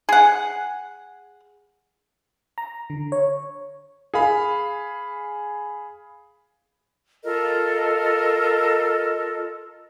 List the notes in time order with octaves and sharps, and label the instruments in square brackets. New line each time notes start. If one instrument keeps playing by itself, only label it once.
[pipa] G#4 F#5
[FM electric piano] A#5
D3
C#5
[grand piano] G#4 F5 B5
[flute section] F4 A4 A#4 D#5